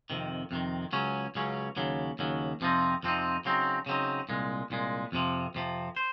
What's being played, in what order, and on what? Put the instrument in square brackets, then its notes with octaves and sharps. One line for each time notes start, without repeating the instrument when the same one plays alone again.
[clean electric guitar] F2 C3 D#3
F2 C3 D#3
C#2 C#3 F#3 C#4
C#2 C#3 F#3 C#4
D#2 C#3 F#3
D#2 C#3 F#3
F2 C3 F3 C4 D#4
F2 C3 F3 C4 D#4
C#3 F#3 C4 D#4
C#3 F#3 C4 D#4
C2 A#2 G#3
C2 A#2 G#3
F2 C3 F3
F2 C3 F3
C5